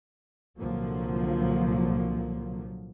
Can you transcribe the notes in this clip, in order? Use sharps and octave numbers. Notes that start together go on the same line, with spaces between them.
C2 A#2 D3 F3 F#3 A#3